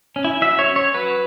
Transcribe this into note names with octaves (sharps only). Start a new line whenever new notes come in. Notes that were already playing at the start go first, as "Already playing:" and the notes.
C#4
E4
F#3 E5
C#5
C#4
C#5
F#3 B4